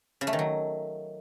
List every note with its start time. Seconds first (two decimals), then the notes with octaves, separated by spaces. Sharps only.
0.21 C#3
0.27 A3
0.33 D#3
0.39 F#3